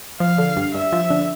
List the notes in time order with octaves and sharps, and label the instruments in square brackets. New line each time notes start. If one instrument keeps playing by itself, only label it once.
[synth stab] F3 [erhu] F5
[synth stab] D3
G2
[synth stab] G2 [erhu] E5
[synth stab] F3
D3